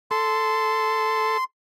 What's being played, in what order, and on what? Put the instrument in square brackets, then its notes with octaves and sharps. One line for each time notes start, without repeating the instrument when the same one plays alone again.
[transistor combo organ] A4 [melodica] C6